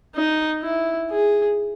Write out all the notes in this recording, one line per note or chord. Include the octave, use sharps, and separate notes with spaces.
D#4
E4
G#4